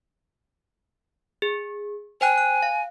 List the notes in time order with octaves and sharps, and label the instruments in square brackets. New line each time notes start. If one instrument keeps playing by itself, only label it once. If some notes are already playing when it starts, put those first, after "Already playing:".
[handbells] G#4
[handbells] C5 G5 F#6 [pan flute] G#5
[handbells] F#6
F5